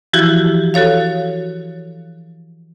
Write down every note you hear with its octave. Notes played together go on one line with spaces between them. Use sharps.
E3 F3 E4 F#4 G4
F#4 A4 C#5 F5